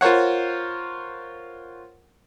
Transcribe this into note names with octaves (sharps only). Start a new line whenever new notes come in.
F4 A#4 C5 C#5 F#5